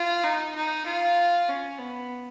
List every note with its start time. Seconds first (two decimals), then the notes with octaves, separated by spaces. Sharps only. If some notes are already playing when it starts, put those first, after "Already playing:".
Already playing: F4
0.24 D#4
0.56 D#4
0.86 F4
1.49 C#4
1.78 B3